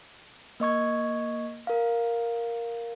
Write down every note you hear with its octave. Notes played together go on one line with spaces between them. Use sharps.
A#3 D#5 C#6 G#6
A#4 F5